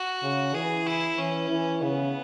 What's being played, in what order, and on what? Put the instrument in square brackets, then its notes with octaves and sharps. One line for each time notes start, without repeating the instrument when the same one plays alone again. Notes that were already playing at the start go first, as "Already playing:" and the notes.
Already playing: [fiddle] F#4
[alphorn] C#3
[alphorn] E3 [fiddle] G#4
[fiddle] E4
[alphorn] E3 [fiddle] C#4
[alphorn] E3
[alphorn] C#3 [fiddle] B3